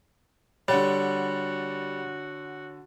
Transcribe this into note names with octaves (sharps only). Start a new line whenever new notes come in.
D3 G3 F#4 C#5 F#5 A6